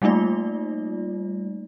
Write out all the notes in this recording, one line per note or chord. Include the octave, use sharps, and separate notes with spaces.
G3 A3 A#3 D#4 F4 D5